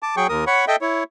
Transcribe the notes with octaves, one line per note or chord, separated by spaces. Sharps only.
A5 D6
F#3 G#4 G5 C#6
D#2 A#4 D#6
C#5 F#5 B5 C#6
A4 D#5 E5 G5
E4 C#5